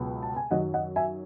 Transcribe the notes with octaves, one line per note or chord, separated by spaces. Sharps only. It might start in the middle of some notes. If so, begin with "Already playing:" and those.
Already playing: C#2 B2 F#3 B3
A5
G#5
F#2 D#3 F#3 D#5 F#5
D#5 F#5
E5 G#5